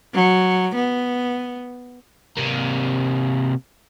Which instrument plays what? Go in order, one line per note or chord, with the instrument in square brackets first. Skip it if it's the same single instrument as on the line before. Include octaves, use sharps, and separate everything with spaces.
[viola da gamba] F#3
B3
[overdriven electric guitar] C3 A#3